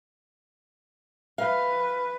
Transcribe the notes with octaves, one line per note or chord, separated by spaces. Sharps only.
B4 F5